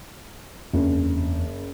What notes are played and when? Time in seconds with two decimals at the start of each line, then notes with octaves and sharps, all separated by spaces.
0.73 F#1 E2 C4 D4